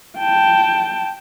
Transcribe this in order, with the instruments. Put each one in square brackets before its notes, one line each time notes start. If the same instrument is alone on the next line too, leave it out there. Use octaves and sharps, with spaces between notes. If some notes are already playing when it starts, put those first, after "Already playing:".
[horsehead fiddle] G5 A5